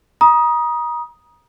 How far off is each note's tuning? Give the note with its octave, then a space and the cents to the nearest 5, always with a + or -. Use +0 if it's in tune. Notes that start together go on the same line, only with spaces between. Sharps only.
A#5 +35 D#6 +0